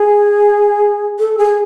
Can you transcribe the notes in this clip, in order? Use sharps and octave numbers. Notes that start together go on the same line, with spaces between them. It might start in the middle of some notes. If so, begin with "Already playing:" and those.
Already playing: G#4
A4
G#4